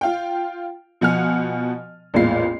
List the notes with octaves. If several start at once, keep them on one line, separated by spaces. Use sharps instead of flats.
F4 F5 G5
B2 F3 F#5 G#5 F6
A1 E2 A#2 G#3 F4 C7